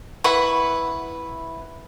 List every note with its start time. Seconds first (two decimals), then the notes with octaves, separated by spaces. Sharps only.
0.24 E4 B4 F#5 C#6